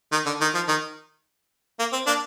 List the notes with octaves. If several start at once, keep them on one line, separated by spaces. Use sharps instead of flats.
D#3
D3
D#3
F3
D#3
A#3
C4
A#3 D4